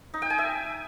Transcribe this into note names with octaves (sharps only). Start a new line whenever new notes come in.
D#4
G5
G#5
E5